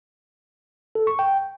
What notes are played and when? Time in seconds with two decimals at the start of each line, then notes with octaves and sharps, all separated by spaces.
0.95 A4
1.07 C#6
1.19 G5